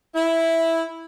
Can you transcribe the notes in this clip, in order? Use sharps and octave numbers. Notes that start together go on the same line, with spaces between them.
E4